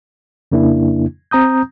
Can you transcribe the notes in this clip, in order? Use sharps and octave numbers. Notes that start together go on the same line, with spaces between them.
F2 C#3 A#3 D4 E4
C4 A#5 D#6 G6